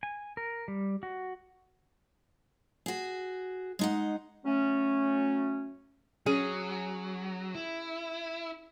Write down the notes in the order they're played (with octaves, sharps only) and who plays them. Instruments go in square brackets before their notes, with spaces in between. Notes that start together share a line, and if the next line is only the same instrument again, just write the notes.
[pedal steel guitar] G#5
A#4
G3
F#4
[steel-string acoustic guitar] F#4 G#4
G#3 D#4 F#5
[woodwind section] F#3 A3 C#4
[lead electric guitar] F#3 [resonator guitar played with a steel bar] C#4 G#4
[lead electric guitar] E4